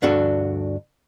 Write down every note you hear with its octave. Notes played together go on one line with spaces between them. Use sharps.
D2 G2 D4 F#4 A4